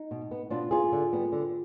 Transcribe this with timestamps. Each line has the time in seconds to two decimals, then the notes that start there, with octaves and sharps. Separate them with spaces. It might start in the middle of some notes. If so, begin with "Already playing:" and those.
Already playing: D#4
0.11 B2
0.31 B3
0.50 B2 D4 F4
0.71 B3 F4 G#4
0.92 D3
1.13 G3 B3
1.32 D3